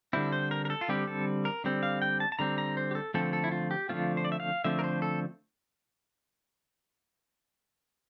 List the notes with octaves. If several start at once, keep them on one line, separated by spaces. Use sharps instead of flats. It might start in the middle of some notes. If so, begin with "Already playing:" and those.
D3 G3 C4 E4
C5
A#4
A#4
A4
F4
D3 G3 C4 G4
A4
A#4
D3 G3 C4
F5
G5
A5
A5
D3 G3 C4 A#5
A#5
C5
G4
A4
D3 F3 A3 C4 A4
A4
E4
F4
G4
D3 F3 A3 C4 F4
C5
D5
E5
F5
D3 F3 A3 C4 E5
A#4
C5
A4